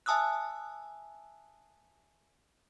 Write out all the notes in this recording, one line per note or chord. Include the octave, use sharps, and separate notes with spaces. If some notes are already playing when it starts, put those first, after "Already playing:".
E5 G#5 A5 D#6 E6 F#6